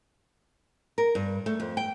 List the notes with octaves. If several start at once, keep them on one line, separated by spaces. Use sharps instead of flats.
A#4
G2
A3
F2
G5